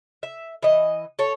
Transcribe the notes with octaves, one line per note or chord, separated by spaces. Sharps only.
E5
E3 D#5
A4 C#5